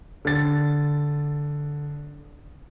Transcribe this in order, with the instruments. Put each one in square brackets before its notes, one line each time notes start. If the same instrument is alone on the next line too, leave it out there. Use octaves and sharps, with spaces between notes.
[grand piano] D3 A6